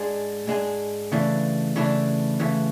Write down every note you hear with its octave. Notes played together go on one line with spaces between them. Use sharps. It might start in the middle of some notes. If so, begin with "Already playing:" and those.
Already playing: G#2 G#3 D4 G#4
G#2 G#3 D4 G#4
C#3 E3 A3 D4
C#3 E3 A3 D4
C#3 E3 A3